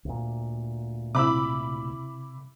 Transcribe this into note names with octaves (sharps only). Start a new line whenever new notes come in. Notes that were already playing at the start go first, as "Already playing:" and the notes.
D2 A#2
C3 E4 B5 D6 E6